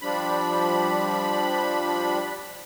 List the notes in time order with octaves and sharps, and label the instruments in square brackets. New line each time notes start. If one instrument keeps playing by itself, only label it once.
[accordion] F3 G3 D4 B5